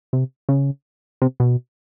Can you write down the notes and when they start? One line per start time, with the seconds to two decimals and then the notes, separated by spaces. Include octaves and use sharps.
0.13 C3
0.49 C#3
1.22 C3
1.40 B2